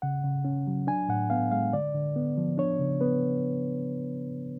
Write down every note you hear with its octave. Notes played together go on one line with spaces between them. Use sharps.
C#3 F#5
C#3
C#4
F#3
D4 G#5
A2 F#5
B3 F5
G#3 F5
D3 D5
D3
B3
F3
D4 C#5
C#3
B3 B4